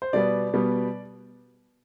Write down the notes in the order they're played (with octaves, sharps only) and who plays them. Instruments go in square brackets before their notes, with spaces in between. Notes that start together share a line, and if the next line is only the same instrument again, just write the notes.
[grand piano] C5
B2 G3 B3 D5
B2 G3 B3